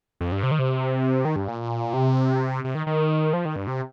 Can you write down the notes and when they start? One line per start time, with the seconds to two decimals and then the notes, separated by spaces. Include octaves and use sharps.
0.21 F2
0.32 G2
0.43 C3
0.51 D#3
0.59 C3
1.25 D#3
1.36 G2
1.48 A#2
1.94 C3
2.64 C3
2.75 D#3
2.87 D#3
3.33 F3
3.45 D#3
3.56 G2
3.67 C3